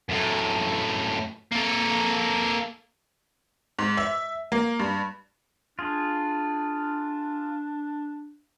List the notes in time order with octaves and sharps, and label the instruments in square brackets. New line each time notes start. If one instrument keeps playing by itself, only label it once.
[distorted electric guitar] F#2 A2
A#3 A4
[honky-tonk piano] G#2
E5
A#3
G2
[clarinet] D4 [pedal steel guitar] F4 G#4